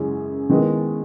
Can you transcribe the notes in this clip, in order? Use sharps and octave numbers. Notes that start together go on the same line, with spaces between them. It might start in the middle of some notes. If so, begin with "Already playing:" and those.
Already playing: F#2 C#3 G#3 C#4 E4
D#3 G#3 B3 E4